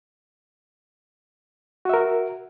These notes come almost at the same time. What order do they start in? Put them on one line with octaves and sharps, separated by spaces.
F#4 E5 A#4